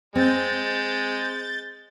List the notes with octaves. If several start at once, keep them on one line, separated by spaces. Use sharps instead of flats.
G#3 C4 G6 A6